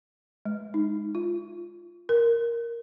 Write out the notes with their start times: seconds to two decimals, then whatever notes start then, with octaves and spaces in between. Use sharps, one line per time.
0.45 G#3
0.74 D#4
1.15 F4
2.09 A#4